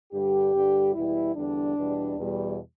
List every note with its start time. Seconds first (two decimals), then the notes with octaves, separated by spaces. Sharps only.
0.12 G2 D3 G3 G4
0.53 G2 D3 G3
0.94 E2 B2 G3 E4
1.35 E2 D3 G3 D4
1.76 E2 B2 G3
2.17 E2 B2 G3